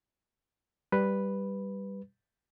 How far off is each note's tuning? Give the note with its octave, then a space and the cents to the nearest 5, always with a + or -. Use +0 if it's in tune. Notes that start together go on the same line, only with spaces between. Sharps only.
G3 +0 B4 +0